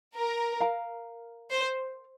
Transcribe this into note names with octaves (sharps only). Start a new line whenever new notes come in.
A#4
A#4 F5 A#5
C5